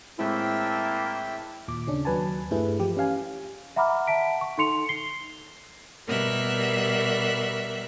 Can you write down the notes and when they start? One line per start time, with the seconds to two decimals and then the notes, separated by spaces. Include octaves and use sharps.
0.19 A2 G#3 A#3 C4 E4 E5 G5 A5
1.68 D#2 A#2 D6
1.87 C#3 C#4 D4
2.05 D#2 F#3 B4 G#5 A5
2.51 G2 G3 A3 E4 G#4 B4
2.80 E3 F3 G4
2.97 C#4 G4 F5 G#5
3.76 E5 F#5 A#5 B5 D6 F6
4.07 E5 F#5 A5 B6 D7
4.41 C#6
4.58 D#4 A4 C6 C#7 F7
4.89 C7 G7
6.07 B2 G3 A#4 E5 F#6